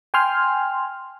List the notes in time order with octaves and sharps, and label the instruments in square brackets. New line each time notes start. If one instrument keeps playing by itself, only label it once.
[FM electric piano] G5 G#5 C6 F6